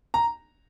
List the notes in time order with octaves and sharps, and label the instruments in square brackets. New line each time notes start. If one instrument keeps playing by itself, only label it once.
[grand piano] A#5